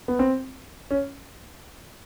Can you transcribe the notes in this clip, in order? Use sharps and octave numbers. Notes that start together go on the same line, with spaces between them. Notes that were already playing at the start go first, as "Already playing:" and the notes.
B3
C4
C#4